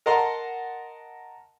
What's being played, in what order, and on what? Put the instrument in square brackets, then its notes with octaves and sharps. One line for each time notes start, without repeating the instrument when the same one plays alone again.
[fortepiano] A#4 D#5 F#5 A5 A#5 C6